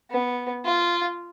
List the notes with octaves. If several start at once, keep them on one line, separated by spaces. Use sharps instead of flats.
B3
F4